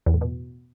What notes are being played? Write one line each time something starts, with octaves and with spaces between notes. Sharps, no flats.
E2
A2
B2